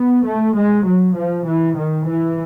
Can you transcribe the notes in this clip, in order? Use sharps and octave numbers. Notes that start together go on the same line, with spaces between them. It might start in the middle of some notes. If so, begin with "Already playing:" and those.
Already playing: B3
A3
G#3
F#3
F3
E3
D#3
E3